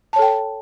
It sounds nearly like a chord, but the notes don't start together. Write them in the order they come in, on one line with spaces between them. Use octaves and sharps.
A5 C#5 A4 G5